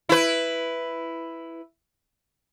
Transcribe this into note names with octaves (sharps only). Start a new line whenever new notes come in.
E4 B4